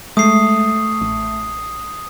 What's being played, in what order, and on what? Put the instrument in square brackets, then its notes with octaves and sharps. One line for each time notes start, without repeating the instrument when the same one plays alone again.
[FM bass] G#3 [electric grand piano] A3 [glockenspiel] D#6 C7
[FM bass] A1